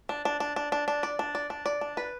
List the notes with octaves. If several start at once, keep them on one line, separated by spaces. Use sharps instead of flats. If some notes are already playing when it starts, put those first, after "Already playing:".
D4
D4
D4
D4
D4
D4
D5
D4
D5
D4
D5
D4
B4